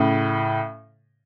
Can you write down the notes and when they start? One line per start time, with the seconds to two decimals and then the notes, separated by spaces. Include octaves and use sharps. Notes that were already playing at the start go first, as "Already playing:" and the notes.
Already playing: A2 C#3